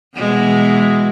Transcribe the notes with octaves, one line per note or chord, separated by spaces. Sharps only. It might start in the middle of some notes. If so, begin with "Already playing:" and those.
B2 E3 G#3